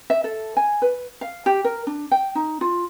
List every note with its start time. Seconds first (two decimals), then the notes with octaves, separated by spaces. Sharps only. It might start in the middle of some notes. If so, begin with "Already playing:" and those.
0.10 E5
0.24 A4
0.57 G#5
0.82 B4
1.21 F5
1.46 G4
1.64 A#4
1.87 D4
2.11 G5
2.35 D#4
2.61 F4